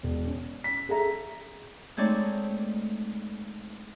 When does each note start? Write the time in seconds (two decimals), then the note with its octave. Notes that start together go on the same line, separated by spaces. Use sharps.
0.03 E1
0.26 C#4
0.64 B6
0.89 G#4 A4 E5 A#5
1.97 G#3 A3 C4 D#4 C#5 D5